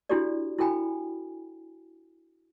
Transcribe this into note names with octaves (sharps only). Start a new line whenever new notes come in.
D4 E4 F#4 G4 A4 D5
E4 F#4 A4 G5 G#5 B5